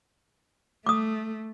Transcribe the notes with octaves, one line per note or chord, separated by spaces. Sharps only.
A3 D6 D#6